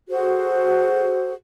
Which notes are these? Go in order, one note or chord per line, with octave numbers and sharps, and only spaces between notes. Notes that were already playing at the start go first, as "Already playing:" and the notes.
F#4 G#4 A4 C5